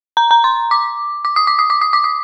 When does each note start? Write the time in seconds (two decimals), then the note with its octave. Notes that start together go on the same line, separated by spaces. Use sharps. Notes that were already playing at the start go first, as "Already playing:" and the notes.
0.17 A#5
0.31 A#5
0.44 C6
0.71 D6
1.25 D6
1.36 D#6
1.47 D6
1.59 D#6
1.70 D6
1.81 D#6
1.93 D6
2.04 D#6